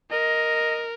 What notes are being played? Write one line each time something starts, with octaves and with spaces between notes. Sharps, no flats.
A#4 D#5